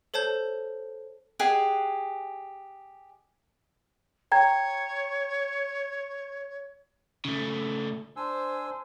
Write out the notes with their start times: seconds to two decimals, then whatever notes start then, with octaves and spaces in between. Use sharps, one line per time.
0.14 A4 C5 C#5 A5 G6
1.39 G4 G#4 D#5 F#5
4.32 C#5 G5 A#5 G#6
7.25 C#3 A3
8.16 D4 C5 G#5 E6